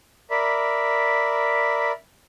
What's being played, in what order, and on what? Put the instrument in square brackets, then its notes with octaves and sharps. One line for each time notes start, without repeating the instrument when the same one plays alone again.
[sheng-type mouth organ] A#4 D5 E5 B5